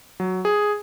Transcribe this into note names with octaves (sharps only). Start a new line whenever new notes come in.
F#3
G#4